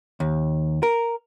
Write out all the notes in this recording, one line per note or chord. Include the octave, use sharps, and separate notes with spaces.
D#2
A#4